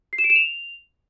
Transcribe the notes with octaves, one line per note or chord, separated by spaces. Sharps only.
C7
E7
D7
E7
F7